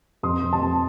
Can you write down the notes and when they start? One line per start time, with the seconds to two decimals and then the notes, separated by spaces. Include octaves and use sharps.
0.23 F2 C6 D#6
0.43 F2
0.53 A5 C6
0.62 F2